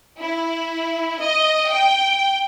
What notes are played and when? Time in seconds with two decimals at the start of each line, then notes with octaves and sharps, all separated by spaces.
0.20 E4
1.20 D#5
1.71 G5